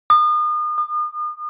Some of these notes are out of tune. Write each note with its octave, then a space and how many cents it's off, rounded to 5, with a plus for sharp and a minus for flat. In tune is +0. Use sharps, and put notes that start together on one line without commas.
D#6 -35
D#6 -40